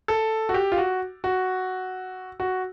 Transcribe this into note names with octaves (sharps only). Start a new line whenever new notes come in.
A4
F#4
G4
F4
F#4
F#4
F#4